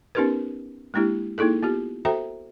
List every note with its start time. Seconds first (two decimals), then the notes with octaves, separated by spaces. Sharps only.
0.15 B3 C#4 D#4 G4 A#4 B4
0.94 G#3 A#3 D4 E4 G4
1.38 A#3 D#4 E4 G#4 A4
1.63 B3 F4 G4
2.05 F#4 A4 C5 E5 G5 A#5